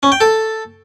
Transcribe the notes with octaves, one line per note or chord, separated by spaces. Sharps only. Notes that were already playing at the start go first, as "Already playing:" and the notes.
C#4
G5
A4